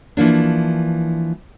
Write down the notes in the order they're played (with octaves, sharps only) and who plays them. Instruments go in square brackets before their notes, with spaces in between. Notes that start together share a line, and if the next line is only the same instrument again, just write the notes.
[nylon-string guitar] E3 F3 A#3 D4